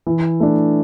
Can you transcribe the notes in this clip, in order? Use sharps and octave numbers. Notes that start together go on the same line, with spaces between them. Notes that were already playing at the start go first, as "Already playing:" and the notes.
E3
A3 D4